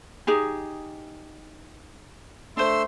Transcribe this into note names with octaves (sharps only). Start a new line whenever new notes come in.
D#4 G4 G#4
A3 D4 C5 C6 E6